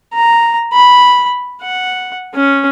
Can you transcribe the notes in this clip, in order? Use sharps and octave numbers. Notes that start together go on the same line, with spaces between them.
A#5
B5
F#5
C#4